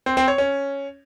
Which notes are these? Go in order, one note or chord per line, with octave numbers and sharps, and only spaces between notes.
C4
C4
C#5
C#4